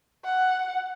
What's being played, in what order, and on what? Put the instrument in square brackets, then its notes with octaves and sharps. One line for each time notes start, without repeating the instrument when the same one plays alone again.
[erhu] F#5